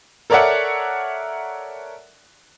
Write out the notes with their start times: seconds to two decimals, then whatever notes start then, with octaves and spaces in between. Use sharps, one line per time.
0.30 A4 A#4 C#5 D5 E5 F#5